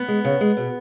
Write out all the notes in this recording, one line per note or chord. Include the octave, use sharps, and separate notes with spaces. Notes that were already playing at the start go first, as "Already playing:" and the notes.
Already playing: B3
G#3
C#3
G#3
B2